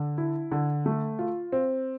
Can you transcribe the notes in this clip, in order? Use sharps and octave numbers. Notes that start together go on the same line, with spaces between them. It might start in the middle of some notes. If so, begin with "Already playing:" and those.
Already playing: D3
E4
D3
A3
F4
C4